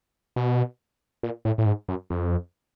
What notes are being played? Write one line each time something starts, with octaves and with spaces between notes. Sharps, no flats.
B2
A#2
A2
A2
G#2
F#2
F2